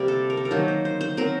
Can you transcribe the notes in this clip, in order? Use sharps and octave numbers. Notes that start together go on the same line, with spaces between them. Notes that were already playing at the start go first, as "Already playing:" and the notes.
Already playing: C3 G3 A#3 G4
A4
A#4
A4
A#4
D#3 F#3 A#3 C5
C5
C5
C5
F#3 C4 A#4